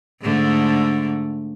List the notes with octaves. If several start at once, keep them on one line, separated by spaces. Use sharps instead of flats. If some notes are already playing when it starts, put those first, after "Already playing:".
G#2 D3 A3